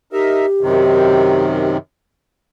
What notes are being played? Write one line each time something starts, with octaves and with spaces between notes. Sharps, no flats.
D#4 G4 A#4 E5
F#2 C3 D#3